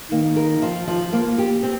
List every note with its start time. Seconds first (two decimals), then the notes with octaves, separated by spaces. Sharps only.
0.11 D#3 A#3
0.36 A#4
0.62 F3
0.87 F3
1.13 A#3
1.38 G4
1.63 C4